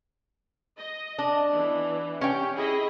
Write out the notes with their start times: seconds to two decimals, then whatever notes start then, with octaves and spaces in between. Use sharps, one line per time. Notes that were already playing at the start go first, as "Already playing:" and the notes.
0.77 D#5
1.18 D4
1.53 E3 B3
2.21 C#4 G4 G5
2.57 E4 G#4 D#5